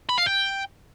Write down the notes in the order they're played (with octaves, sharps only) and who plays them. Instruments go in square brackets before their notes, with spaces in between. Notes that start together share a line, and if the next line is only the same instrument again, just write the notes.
[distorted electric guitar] B5
F5
G5